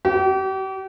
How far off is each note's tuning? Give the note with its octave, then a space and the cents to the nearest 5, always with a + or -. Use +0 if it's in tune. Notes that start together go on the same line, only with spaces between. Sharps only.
G4 -40